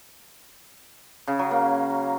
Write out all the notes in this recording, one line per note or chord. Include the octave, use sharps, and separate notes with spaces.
C#3
F#3
A#3